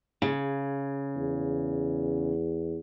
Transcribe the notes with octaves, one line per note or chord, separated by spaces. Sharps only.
C#3
E2